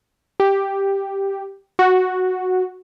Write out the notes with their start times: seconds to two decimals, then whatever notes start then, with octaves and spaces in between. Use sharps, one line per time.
0.40 G4
1.79 F#4